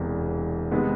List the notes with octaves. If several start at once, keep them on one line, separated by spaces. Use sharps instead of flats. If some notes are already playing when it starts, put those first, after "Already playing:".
Already playing: E1 E2 C3 E3
C3 D#3 G#3 B3